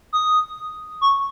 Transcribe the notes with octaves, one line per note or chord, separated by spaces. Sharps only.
D#6
C#6